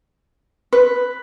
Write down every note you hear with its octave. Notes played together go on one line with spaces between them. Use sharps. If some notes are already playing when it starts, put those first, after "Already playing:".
B4